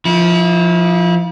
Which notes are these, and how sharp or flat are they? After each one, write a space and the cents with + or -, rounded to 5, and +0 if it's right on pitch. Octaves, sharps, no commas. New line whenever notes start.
F3 +0 E4 -30